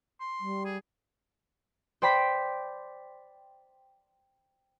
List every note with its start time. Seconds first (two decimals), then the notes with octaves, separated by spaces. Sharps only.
0.20 C6
0.40 G3
0.65 G#4
2.02 C5 D5 G5 B5 B6